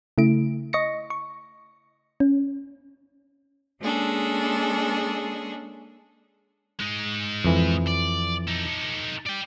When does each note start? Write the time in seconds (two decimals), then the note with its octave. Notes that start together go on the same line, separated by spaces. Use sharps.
0.18 C#3 A3 E4 D7
0.73 D#5 C#6 A#6 C#7
1.10 C#6
2.20 C#4
3.81 G#3 A#3 C#4 D4 G#4 A4
6.79 G#3 D#4
7.45 F2 E3
7.87 D5
8.47 D#4 A4
9.27 D5 G5